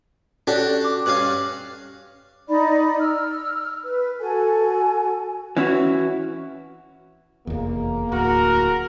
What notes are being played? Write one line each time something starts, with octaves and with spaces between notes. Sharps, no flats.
C#4 D4 F#4 G4 A4 D5
D6
G2 C#4 F5 F#6
D#4 D5 B5
E6 F6
B4
F#4 A4 G#5
E3 C#4 E4 F#4
F1 E2 A#3 G#4
D1 F#4 A#4